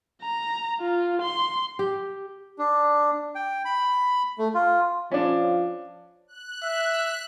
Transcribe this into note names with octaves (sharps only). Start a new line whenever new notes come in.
A#5
F4
C6
G4
D4
G5
B5
A3
F4
F3 C#4 D4
F#6
E5